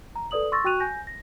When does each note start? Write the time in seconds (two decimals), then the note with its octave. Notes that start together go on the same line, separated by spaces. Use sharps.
0.16 A#5
0.31 A4 B4 D5 D#6 F#7
0.52 C6 C#6 E6 A6 A#6
0.64 F#4 G5 C#6 F#6 D#7 F7
0.80 G#5 G6 A#6
1.07 A#6